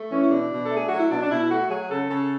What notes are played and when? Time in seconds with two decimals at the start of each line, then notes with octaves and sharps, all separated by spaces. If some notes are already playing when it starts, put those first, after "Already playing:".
Already playing: A3
0.11 E3 C#4
0.22 E4
0.31 B2 D4
0.51 B2
0.65 A4
0.71 A3
0.76 G#4
0.88 F#3 F#4
0.99 E4
1.10 B2 D4
1.22 D4
1.30 B2 E4
1.50 A3 F#4
1.69 F#3 G#4
1.89 C#3 A4
2.09 C#3 A4